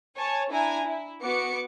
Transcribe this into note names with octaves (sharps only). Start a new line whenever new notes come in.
C#5 G#5 A5
D4 E4 G#5 A#5
E4
B3 F#4 D6 C#7